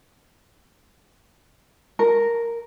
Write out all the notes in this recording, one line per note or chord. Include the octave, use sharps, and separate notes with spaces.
A#4